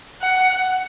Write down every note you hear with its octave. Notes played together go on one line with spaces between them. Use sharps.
F#5